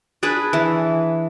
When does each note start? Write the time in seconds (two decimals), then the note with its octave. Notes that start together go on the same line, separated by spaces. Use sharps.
0.23 D4 G#4 B4
0.53 E3